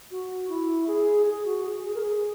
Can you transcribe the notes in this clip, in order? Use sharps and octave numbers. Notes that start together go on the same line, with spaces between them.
F#4
E4
G#4
G#4
F#4
G#4
G#4
A#4
G#4